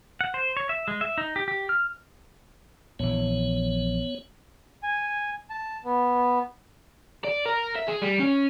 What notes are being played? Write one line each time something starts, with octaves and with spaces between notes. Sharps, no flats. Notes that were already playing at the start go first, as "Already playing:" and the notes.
F#5
C5
C#5
E5
G#3
E5
D#4
G4
G4
F6
A#1 E3 B3 C#5
G#5
A5
B3
D5
A#4
E5
G#4
G3
C#4